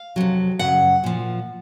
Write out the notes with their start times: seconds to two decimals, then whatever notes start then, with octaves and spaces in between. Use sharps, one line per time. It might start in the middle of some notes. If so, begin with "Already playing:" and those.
Already playing: F5
0.16 F2 C3 F#3
0.59 F#2 C#3 F#3 F#5
1.04 A#2 F3